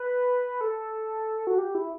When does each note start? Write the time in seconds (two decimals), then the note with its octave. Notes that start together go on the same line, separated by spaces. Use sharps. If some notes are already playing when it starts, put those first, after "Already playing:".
Already playing: B4
0.61 A4
1.47 F#4
1.58 G4
1.75 E4